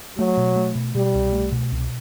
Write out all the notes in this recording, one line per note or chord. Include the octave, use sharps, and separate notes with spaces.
F#3 A3
B2
A3
B2
B2 G3
C2
A3
B2
C2